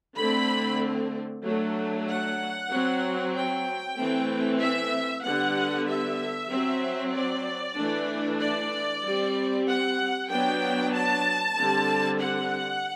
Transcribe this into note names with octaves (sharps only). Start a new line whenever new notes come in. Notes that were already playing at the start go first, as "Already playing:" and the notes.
D3 A3 C4 B5
F#3 A3 D4
F#5
F#3 C4
G5
E3 A3 C4
E5
D3 G3 B3 F#5
E5
F#3 C4
D5
E3 A3 D4
D5
G3 C4
F#5
F#3 B3 D4 G5
A5
D3 G3 C4
F#5